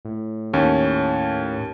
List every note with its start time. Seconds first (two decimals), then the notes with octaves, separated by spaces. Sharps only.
0.05 A2
0.53 D#2 C#4